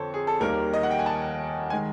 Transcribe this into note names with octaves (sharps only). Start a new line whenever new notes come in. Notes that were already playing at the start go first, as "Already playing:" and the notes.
Already playing: F2 D3 A4 C5 C#5
G#4
A4
D#2 D#3 G3 A#3 A#4
D#5
F#5
G5
G#5
A5
D#3 G#3 G#5